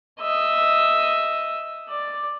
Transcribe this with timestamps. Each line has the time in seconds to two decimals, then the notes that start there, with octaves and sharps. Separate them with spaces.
0.20 D#5 E5
1.89 D5